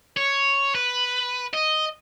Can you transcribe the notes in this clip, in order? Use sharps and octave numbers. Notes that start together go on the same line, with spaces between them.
C#5
B4
D#5